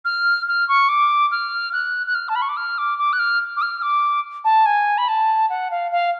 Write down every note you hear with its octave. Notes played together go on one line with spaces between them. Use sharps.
F6
F6
C#6
D6
F6
F#6
F#6
F6
A5
B5
C#6
D6
F6
D6
D6
F#6
F6
D6
F6
D6
A5
G#5
B5
A5
F#5
F5
F5